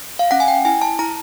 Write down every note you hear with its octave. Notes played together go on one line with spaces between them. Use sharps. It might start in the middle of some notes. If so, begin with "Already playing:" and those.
F5
C#4 F#5
G#5
G5
E4 G#5
A5
E4 A#5